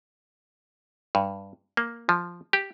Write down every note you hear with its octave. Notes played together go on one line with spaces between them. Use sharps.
G2
A#3
F3
G4